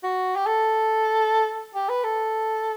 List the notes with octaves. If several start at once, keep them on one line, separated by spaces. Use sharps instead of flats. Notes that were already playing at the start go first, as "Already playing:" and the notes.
F#4
G4
A4
G4
B4
A4